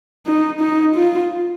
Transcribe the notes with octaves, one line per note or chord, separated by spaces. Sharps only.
D#4
D#4
F4